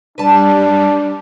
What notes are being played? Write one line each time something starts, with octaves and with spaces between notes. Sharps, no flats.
G3 D4 B4 A5